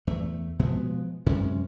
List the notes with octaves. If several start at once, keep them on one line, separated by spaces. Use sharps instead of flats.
E2 A3
B2 F3 G#3 B3
F#2 C3 G#3 C#4